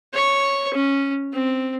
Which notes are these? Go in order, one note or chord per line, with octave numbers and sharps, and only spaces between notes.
C#5 C#6
C#4
C4